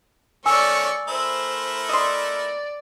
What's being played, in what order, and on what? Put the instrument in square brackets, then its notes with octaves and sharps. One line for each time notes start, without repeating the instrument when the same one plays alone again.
[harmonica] D#3 A3 C#4 [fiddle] D5 C#6 [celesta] G#5 E6
[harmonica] A3 E4 A#4 [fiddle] C5
[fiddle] D5 [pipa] D#5 C6